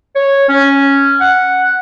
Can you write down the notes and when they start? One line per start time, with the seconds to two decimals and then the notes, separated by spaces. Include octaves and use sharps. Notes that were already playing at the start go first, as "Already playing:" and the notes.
0.15 C#5
0.49 C#4
1.21 F#5